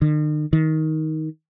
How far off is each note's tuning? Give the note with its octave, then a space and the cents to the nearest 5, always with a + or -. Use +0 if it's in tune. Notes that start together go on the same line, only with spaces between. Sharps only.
D#3 -45
D#3 +15